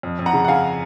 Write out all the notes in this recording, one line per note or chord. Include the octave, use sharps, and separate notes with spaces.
F2
F2
F#5 A#5
C#3
F#5
C#3 F5 G#5